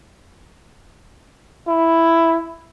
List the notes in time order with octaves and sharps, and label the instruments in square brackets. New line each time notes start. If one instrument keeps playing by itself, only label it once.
[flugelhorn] E4